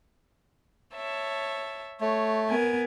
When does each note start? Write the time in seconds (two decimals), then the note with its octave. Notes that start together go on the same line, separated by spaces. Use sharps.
0.93 C#5 E5 A5
2.01 A3 C#5
2.50 B3 A#4 G#5